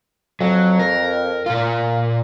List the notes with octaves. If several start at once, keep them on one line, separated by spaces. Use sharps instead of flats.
F2 F#3
A#4
A#2 A#3 F4